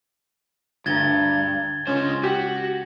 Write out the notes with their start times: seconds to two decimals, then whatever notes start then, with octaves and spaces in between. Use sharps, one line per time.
0.86 D2 G2 D3 A#5 G#6 A6 G7
1.87 C#2 G#3 C#4 C5
2.24 F#4 G4